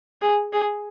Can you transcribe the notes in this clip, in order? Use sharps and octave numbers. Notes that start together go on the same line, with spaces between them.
G#4
G#4